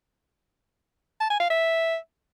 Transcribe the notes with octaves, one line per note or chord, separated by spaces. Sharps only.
A5
G#5
F5
E5